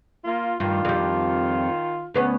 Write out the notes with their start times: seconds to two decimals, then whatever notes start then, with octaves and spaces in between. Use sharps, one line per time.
0.25 A#3 F4
0.60 G2 D#3 F4
0.85 F2 G3
2.14 D2 B3 C#4